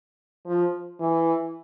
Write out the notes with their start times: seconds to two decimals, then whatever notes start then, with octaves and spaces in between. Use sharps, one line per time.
0.47 F3
1.00 E3